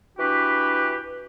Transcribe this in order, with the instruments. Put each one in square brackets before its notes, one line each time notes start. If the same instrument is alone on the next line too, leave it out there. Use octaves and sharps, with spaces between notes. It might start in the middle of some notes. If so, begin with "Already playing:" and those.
[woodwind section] E3 D4 F#4 G4 B4